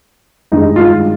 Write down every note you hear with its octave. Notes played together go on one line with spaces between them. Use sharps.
G2 D#3 G#3 D#4
F4